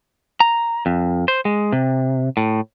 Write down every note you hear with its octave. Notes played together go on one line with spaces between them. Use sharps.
A#5
F2
C5
G#3
C3
A2